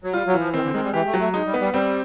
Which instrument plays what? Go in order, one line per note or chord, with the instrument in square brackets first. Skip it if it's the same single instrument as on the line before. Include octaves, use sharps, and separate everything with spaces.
[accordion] F#3
[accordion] G3 [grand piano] F4
[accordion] F#3
[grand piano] E3
[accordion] F3
[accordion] D#3 [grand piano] C4
[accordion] D3
[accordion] D#3 [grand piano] G#3
[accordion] G3
[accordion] E3 [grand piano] G4
[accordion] A3
[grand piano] F#3
[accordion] A3
[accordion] G#3 [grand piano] D#4
[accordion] G3
[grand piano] B3
[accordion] G3
[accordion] G3 [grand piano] C4